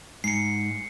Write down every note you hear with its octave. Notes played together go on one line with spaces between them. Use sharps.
G#2 C7 C#7